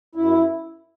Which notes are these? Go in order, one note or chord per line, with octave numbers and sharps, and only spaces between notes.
F#2 E4